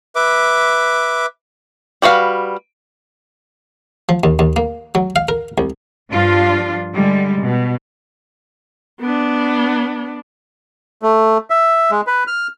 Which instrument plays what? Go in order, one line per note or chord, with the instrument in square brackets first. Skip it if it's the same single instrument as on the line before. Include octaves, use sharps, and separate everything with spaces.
[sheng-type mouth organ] B4 E5 D6
[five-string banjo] G3 F#4 B4 F5
[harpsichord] F3
D#2
D#2
A#3
F#3
F5
A#4
C2
[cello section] G2 F3 D4 F4
D3 G3 G#3
B2
[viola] B3 D4
[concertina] A3
E5
G#3
B4
F6